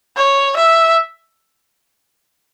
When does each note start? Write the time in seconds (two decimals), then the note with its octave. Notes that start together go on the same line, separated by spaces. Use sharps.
0.16 C#5
0.56 E5